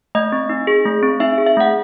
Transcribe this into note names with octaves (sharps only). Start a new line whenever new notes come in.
A3 D#5
C4
D#4
G#4
A3
C4
D#4 E5
G#4
E5
A3 F#5